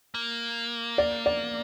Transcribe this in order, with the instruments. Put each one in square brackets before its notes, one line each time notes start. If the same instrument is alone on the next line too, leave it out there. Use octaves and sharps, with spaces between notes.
[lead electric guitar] A#3
[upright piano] D5
D5